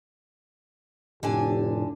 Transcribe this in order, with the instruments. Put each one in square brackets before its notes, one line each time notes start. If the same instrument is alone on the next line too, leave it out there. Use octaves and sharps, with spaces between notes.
[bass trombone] F1 [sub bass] A2 [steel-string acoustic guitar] D3 D4 G#5 [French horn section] G4